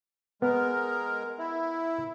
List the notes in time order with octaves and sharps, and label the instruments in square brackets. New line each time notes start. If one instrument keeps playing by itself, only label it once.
[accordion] G#3 A#4 [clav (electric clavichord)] B3
[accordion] E4